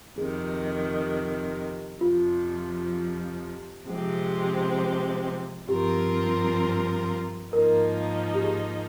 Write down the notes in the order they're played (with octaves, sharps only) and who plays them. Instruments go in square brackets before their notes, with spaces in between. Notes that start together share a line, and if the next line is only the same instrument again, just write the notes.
[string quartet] F2 C3 D#3 [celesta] G#4
[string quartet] F2 C3 F3 [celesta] F4
[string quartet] C3 F3 G#3 C4 G4
[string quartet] G2 F3 C4 F4 A#4 [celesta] G4
[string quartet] G#2 F3 A#3 D#4 [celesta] A#4
[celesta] G4
G#4